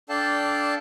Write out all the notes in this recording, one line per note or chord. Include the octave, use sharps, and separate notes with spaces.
D4 A4 D5 F5 G5 A5